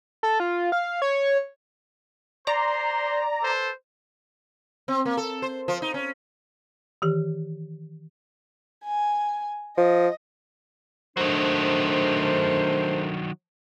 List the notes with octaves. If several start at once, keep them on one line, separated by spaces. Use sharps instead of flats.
A4
F4
F5
C#5
C5 D5 A#5 C6
A4 B4 C5
C4
A#3
A4
C5
F3
D#4
C#4
D#3 E3 G4
G#5
F3 D#5
D#3 F#3 A3 D4 A#4 C5